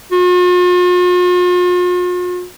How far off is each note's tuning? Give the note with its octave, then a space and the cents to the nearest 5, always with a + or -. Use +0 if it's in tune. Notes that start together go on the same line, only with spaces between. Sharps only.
F4 +45